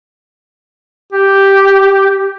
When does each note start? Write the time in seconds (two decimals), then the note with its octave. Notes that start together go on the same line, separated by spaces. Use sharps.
1.12 G4